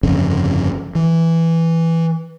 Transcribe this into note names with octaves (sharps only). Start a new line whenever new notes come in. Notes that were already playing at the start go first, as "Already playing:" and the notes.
G1 F2 C#3
E3